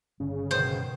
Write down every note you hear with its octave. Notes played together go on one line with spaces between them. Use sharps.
G1 C#3
B2 D#3 C5